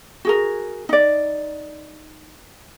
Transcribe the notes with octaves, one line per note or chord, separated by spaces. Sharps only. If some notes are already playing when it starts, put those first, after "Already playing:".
F#4 G#4 A#4
D#4 D5